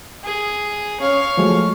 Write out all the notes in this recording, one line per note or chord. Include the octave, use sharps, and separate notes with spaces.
G#4
C#4 C#5 F5
F3 F#3 G#3 A3